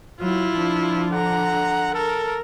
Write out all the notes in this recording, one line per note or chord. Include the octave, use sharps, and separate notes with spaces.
F#3 E4 F4
F3 D4
D3 F#5 A#5
A4 A#4